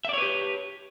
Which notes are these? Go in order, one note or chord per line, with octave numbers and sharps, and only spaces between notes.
G4 B4 C#5 D5 E5